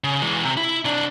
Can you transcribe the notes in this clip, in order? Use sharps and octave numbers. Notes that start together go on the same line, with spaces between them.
C#3
E3 G#3
C3
E4
C3 D4